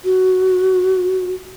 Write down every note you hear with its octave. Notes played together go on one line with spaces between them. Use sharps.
F#4